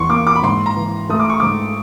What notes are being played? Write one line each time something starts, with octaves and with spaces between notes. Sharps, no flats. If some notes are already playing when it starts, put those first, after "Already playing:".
Already playing: E2 C6 C#6
A#3 D6
D6
B5
G#2 C6
A#5
E3
A3 D#6
D6
C#6
G#2 D6